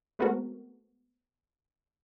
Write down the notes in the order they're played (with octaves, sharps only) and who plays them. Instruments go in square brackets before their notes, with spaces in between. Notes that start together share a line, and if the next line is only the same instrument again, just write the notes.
[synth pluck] G#3 A3 B3 C4 F#4 A#4